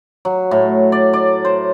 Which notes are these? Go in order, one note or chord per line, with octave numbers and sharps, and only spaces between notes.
F#3
A2
D5
D5
C5